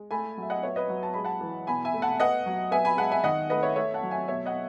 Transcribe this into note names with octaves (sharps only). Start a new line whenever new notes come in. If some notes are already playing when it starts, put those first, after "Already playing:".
Already playing: G#3
A3 G#5 B5
F#3 E5
D#5 F#5
B3 C#5 E5
B4 D#5
F#3
A5
G#3 B5
F#5 A5
E3
B2 G#5 B5
E5 G#5
A3
F#5 A5
B3 D#5 F#5
F#3
B3 E5 G#5
G#5 B5
G#3 F#5 A5
E5 G#5
D#3 D#5 F#5
A3 B4 D#5
C#5 E5
A3 C#5 E5
F#5 A5
F#3
E5 G#5
B2 C#5 E5
D#5 F#5